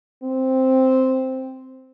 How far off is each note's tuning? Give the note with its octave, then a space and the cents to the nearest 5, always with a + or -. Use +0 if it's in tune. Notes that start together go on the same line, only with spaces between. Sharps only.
C4 +0